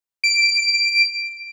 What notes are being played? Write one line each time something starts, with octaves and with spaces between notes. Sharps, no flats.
D7